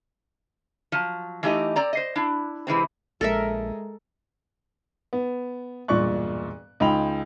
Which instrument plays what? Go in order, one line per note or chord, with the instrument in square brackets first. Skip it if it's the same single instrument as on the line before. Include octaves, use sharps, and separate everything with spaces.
[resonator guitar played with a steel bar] F3 F#3
E3 A3 D#4 G4 D#5
C4 D5 A#5
C5 D#5
D4 E4
C3 E3 G#3 C4
[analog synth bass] A#1 [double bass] G#3 [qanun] A4 A#4 E5
[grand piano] B3
E1 G2 A#2 D5 C#6 F#6
C#2 D#4 G5 B5 F7